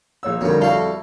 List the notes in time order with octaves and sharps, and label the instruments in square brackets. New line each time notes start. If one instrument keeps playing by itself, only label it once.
[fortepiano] A#1 C#5 E6
[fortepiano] F2 [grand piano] D3 A#4 C#5 [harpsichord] F#3 G3
[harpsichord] G3 F#4 [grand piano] E4 [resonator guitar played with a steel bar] A4 F5